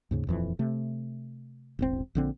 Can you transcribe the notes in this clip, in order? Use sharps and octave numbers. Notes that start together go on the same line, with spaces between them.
D#2 G#2 C#3
D#1 F2 E3
C3 A3
E1 A1 C4
A#1 D3 C4